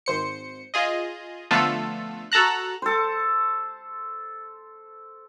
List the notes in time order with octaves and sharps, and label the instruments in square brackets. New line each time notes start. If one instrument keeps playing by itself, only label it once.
[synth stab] G#1 C5 C#7
F4 G#4 D#5
D3 F3 A3 B3 F4 A4
F#4 A4 A5 A#5 F#6
[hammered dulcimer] A4 C5